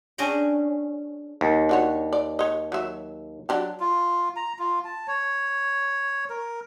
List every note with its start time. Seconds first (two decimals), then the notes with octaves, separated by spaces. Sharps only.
0.18 C#4 D4 G#4 D#5 G5
1.41 D#2
1.69 D4 F#4 C#5
2.13 D5
2.39 C#5 D#5
2.72 F#3 E5
3.49 F#3 D4 G4
3.80 F4
4.36 A#5
4.59 F4
4.84 A5
5.08 C#5
6.30 A#4